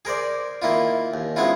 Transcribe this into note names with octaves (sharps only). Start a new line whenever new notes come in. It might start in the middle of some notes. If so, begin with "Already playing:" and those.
G#4 A#4 C5 D5
D#3 A#3 E4 F4
D#2
F3 G#3 B3 C#4 E4 F4